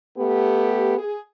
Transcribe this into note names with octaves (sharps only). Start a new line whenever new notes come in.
A3 B3 G4
G#4